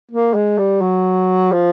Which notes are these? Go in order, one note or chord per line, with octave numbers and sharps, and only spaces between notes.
A#3
G#3
G3
F#3
F3